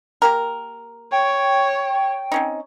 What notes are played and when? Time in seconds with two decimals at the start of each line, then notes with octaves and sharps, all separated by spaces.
0.22 A#3 G4 A#4
1.12 C#5 G5
2.32 C4 C#4 D#4